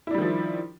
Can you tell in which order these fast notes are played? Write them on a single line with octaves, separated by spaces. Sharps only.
E4 D4 G3 D#3 F3